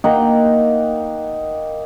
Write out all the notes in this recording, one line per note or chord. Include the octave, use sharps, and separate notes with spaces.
A#3 D#4 F#5 G5